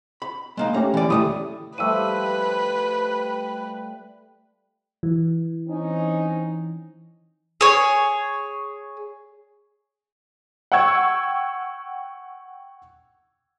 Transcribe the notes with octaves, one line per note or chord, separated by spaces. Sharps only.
B5
G#3 A#3 D#4
A3 C#4 G4 A#5
E3 D5
D2 D3 A3 E4 G4 D#6
F3 G3 A3 B4 E5 E6 D#7
E3
C4 C#4 D#4
G#4 C#5
F#5 G5 C#6 E6 G#6